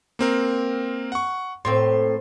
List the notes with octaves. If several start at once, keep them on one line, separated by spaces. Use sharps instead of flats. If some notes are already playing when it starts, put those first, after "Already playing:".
A#3 C4 A#4
F#5 C#6
A2 A#3 C4 C6